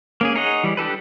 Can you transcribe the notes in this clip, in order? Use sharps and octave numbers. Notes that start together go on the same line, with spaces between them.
A#3 C#4 G#4
D#4 G#4 C#5 D#5 F#5
E3 G3
D4 G4 A4 B4